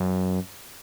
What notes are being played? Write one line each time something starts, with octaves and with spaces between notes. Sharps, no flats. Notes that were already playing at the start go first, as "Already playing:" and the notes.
Already playing: F#2